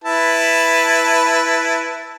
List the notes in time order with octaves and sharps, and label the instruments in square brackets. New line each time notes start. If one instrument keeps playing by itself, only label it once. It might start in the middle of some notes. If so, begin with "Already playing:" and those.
[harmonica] E4 B4 A5